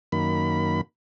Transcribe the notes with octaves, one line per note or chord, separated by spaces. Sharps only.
F#2 D#3 A#3 B5